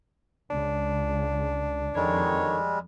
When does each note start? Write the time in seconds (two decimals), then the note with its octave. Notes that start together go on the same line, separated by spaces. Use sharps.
0.50 C#2 C#3 D4
1.95 F2 D3 D#3 G3 G#3 C#5